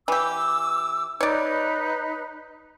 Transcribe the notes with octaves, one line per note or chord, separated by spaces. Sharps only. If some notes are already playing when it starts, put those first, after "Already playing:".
E3 G4 D6 E6
D#4 B4 C#5 D5